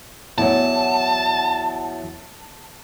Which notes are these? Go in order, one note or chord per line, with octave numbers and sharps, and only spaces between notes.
E2 F#3 A5